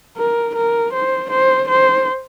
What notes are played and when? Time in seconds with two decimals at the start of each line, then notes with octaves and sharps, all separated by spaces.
0.17 A#4
0.55 A#4
0.93 C5
1.30 C5
1.69 C5